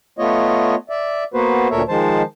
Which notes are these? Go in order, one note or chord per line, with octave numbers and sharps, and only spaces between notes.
A3 B3 F4 C#5 D#5
D5 E5
A#3 B3 F#4 B4 C5
D2 A#2 A4 A#4 C#5 E5
D#3 F3 G#3 C5 A5